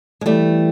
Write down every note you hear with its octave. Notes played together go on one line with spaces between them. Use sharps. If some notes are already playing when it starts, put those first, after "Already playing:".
G#3
E3 G3 A3